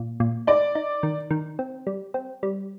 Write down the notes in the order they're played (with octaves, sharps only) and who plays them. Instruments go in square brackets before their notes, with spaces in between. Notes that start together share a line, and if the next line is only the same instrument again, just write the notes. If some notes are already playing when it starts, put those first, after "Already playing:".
Already playing: [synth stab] A#2
A#2
[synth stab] D#4 [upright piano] D5
[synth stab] D#4
D#3
D#3
C4
G3
C4
G3